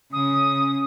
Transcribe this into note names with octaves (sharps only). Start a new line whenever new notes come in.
C#3 D#6